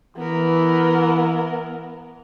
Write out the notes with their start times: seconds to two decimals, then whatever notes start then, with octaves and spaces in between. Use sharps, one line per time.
0.17 E3 B3 A#4